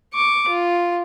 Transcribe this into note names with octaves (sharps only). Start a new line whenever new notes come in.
C#6 D6
F4